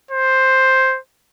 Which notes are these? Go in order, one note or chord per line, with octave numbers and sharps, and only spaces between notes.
C5